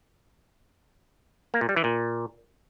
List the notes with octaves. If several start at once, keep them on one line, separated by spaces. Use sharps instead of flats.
A#3
A#2
G3
E3
A#2